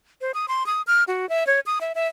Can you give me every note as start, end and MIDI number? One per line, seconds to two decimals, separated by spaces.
0.21 0.32 72
0.34 0.46 87
0.48 0.66 84
0.66 0.82 87
0.87 1.04 89
1.08 1.28 66
1.29 1.46 76
1.47 1.60 73
1.66 1.79 87
1.81 1.93 76
1.95 2.07 76